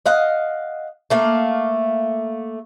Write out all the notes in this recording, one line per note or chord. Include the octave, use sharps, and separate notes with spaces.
D#5 F5 F#5
A3 A#3 F5